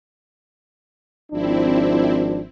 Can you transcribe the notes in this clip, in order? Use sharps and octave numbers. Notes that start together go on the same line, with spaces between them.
G#1 F3 C4 D4 E4